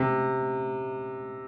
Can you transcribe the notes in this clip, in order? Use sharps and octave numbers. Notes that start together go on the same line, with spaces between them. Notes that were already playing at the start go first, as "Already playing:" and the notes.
Already playing: C3